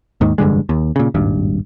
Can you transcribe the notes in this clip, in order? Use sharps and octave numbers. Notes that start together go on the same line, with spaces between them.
D#2 G#2 D#3
F1 G2 D3 G#3
D#2
A#2 C#3
D#1 G#1 G2